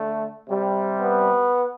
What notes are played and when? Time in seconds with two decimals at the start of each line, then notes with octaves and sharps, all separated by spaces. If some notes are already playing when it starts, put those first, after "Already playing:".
Already playing: D3 A3
0.48 C3 G3
1.01 B3